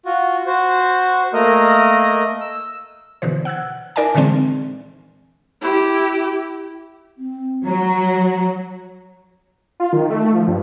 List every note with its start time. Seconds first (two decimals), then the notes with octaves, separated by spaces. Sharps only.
0.05 F4 F#4
0.46 F#4 C5
1.33 A3 A#3 A#4 D#5
2.41 E6
3.22 B2 D3 E3 C5
3.45 F#5 E6 F#6 G#6
3.96 D#4 A#4 D5 E5 G#5 A5
4.15 A#2 D3 E3 G#3 C4
5.62 E4 G4
7.18 C4
7.66 F#3 A#5
9.80 F4
9.93 D#3
10.10 A3
10.35 F3
10.48 G2